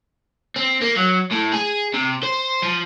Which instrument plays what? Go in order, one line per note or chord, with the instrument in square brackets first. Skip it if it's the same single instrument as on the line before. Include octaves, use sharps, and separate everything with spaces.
[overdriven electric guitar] C4
A#3
F#3
A2
G#4
C3
C5
F3